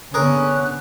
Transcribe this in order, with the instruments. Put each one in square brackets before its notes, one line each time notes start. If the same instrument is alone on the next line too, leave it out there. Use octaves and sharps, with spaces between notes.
[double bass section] D3 B3 [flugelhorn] C#4 [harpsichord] G#4 A#4 [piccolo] F#6